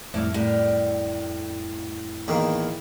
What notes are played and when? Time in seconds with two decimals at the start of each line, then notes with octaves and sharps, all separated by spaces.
0.14 F2 A2 G3 A3 A#3 E4 D5
0.34 A2 D3 G4 A#4
2.28 E2 D#3 A#3 E4